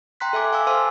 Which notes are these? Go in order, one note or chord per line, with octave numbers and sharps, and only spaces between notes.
G5 A#5 C6 F#6 B6
A4 E5 G#5 D6
F5 G#5 D6 E6
A4 C5 F5 A5 C6 F6